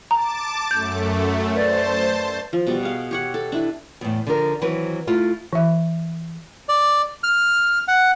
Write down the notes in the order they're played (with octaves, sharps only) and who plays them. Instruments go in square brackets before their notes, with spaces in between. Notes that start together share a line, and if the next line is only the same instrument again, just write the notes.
[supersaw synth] A5 D6 [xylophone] A#5
[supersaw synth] F#2 A3 [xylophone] G6
[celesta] B4 D5 A6 [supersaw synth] C5 A5
[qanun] F3
B2 G3
G#4 F5
G4 C#5 F#5
A4
D4 E4 B4
[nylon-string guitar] E2 A2
D3 F3 A#4
D#3 E3 F#3 C4 B4
A3 E4 F4
[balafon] E3 E5
[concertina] D5
F6
F#5